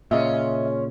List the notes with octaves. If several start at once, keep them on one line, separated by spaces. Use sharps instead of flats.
A#2 C#3 G#3 C#4 F4 D#5 E5